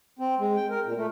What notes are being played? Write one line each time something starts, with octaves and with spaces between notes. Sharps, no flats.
C4
G#3
G5
A#4
A#2
A3